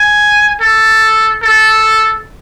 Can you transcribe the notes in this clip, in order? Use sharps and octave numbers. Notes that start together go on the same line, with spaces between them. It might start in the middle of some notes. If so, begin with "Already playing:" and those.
Already playing: G#5
A4
A4